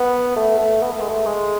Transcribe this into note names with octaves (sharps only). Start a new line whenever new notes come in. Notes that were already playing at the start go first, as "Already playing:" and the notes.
Already playing: B3
A3
A3
B3
A3
G#3
A3
G#3